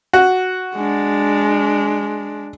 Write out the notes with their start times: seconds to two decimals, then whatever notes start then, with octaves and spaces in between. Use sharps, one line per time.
0.13 F#4
0.76 G#3 D4